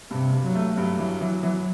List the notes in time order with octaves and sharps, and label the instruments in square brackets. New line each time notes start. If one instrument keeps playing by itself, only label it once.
[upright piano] G2 [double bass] C3
[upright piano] G2
[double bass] F#3
[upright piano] A3
[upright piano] G2 [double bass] F#3
[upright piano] E3
E3
E3